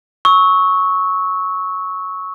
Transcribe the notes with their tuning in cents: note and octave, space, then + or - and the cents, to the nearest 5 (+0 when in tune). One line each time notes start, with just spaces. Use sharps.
C#6 +0 E6 -30